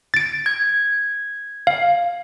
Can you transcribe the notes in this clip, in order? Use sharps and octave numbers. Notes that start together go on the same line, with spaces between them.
A6 D7
G#6
F5